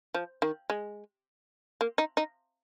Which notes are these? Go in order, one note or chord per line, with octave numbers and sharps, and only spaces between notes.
F3
D#3
G#3
A#3
D#4
D#4